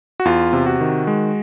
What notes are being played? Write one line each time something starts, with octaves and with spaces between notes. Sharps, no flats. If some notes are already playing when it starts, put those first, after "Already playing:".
F#4
E2 F4
C3
F#4
D#3
G#3